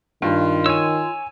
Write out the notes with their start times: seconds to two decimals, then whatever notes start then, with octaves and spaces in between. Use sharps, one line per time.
0.22 G2 D#3 F4
0.66 C#5 G#5 E6